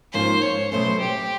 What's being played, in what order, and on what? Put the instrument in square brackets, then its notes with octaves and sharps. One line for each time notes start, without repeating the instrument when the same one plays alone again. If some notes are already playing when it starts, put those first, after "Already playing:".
[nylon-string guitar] G#2 F3 A#3 C#4 [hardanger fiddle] C5
[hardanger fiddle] C#5
[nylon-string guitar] B2 F#3 A3 C#4 [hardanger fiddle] C5
[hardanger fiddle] G4